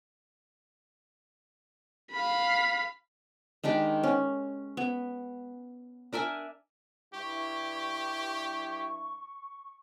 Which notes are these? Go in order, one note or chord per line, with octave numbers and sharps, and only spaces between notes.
F5 B5
D#3 G#3 D4 G4
C#4
B3
D4 A#4 E5 G#5
G2 E4 G4 C#6